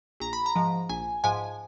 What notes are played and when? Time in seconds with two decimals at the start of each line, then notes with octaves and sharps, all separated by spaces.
0.20 A#1 A#5
0.33 B5
0.46 A#5
0.56 G#2 F3
0.89 A#1 G#5
1.24 G#2 F3 G#5